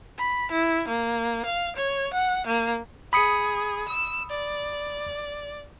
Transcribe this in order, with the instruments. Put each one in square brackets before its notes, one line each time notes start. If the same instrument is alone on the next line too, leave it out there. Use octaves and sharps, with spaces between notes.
[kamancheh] B5
E4
A#3
F5
C#5
F#5
A#3
[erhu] G#4 [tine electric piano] B5 D#6 C#7
[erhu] E6
D5